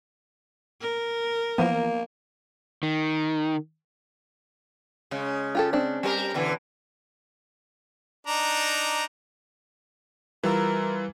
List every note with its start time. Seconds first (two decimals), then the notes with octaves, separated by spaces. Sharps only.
0.81 A#4
1.58 E3 F3 A#3 B3
2.83 D#3
5.11 C#3 G#3
5.55 F4 G4 A4
5.73 C4 D4
6.03 G3 G4 A#4
6.34 B2 D3 E3
8.27 D4 D#4 A#5
10.43 E3 G3 F4 A#4 B4 B5 E6